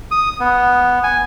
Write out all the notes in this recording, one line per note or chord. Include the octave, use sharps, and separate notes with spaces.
D#6
B3
G#5